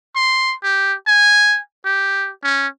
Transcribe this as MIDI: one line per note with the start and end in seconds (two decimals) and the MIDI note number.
0.16 0.55 84
0.63 0.94 67
1.07 1.59 80
1.85 2.30 67
2.44 2.68 61